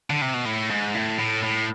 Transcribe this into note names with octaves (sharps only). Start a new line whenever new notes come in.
D3
C3
B2
A2
G#2
A2
A2
A2